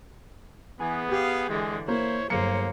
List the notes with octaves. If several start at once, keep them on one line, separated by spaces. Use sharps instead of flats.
E3 B3 G#4
G4 F5
D3 E3 G#3
A#3 E4 C5 C#5
G1 F#3 A#3 G#4 C5 C#7